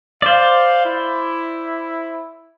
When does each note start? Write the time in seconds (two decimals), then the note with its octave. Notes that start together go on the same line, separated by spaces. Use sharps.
0.22 C5 D5 F5
0.85 E4